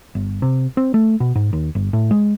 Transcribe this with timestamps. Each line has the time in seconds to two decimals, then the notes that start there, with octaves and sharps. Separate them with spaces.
0.15 G1
0.42 C3
0.77 C4
0.94 A3
1.20 B2
1.36 G#2
1.53 D#2
1.75 G1
1.93 A2
2.11 G#3